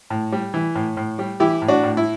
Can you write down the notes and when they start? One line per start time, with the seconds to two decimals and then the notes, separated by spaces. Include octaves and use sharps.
0.10 A2
0.32 G3
0.54 E3
0.75 A2
0.97 A2
1.19 G3
1.40 E3 E4 G4
1.62 A2
1.68 D4 F#4
1.84 A2
1.97 E4